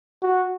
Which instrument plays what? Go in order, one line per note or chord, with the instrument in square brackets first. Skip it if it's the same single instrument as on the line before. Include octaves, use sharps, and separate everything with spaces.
[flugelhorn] F#4